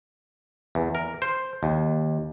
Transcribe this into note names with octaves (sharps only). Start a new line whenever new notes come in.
E2
A#4
C5
D#2